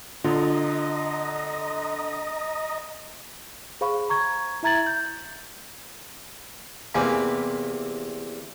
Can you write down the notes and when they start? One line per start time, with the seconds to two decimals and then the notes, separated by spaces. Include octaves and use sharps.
0.24 D3 F4 D#5 A#5
3.81 G#4 C5 F5 B5 C#6
4.10 A#5 C#6 G#6
4.63 E4 E5 A#5 G#6 A6 F#7
4.87 G6
6.94 E2 C3 A#3 G#5 B5